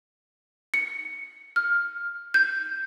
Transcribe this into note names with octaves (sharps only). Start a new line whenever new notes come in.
C#7
F6
G6